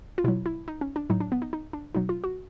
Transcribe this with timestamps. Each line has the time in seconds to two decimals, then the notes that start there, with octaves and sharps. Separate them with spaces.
0.18 F4
0.24 B2 F#3 E4
0.46 E4
0.68 D#4
0.81 C#4
0.96 D4
1.10 A2 F#3 D#4
1.20 D4
1.32 B3
1.42 D#4
1.53 D#4
1.73 D4
1.95 B2 F#3 D#4
2.09 F4
2.24 F#4